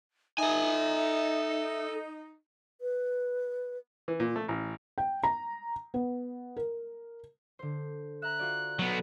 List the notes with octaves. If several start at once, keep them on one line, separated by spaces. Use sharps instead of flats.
D#4 A4 E5 G#5
B4
E3
A#2
A3
A1
G5
A#5
B3
A#4
D3 C5
E5 A#5 F#6
F4 F#4 D5
F#3 B3 F#4 A4